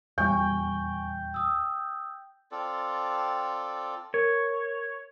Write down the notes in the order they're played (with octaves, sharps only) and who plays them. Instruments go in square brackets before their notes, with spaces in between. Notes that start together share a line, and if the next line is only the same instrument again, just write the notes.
[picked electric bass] D#1 E2 G3 [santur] G5 [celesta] G#5 C#6
[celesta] D#6 E6
[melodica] C4 F4 A4 D5
[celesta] A#4 [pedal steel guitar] C#5